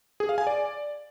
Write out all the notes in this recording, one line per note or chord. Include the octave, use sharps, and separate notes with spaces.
G#4
F5
G#5
D5